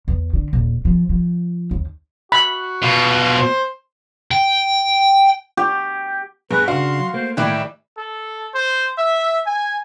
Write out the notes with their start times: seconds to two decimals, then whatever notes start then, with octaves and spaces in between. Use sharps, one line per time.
0.08 E2
0.33 D3
0.53 D#1
0.85 F3
1.09 F3
1.71 D#2
2.32 F#4 B5
2.82 B2 F4
3.37 C5
4.31 G5
5.57 G4
6.51 G2 B3 G#4 B4
6.68 C#3 D4 F#4 F5 C6
6.99 F#3
7.14 A3 A#3 C5
7.37 A2 D#3 E3 G3 E4 G5
7.98 A4
8.55 C5
8.98 E5
9.45 G#5